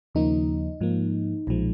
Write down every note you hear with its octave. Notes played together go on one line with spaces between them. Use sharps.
D#2 C#3 F3 A#3 D#4
G#2 F3 A#3
B1 A#2 F3 G#3